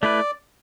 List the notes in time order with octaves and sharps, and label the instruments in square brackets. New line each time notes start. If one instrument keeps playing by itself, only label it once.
[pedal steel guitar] A3 E4 B4 [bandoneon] D5